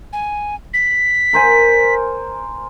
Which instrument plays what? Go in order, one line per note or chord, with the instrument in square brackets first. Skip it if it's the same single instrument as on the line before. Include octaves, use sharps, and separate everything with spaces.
[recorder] G#5
B6
[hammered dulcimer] A#4 C5 G#5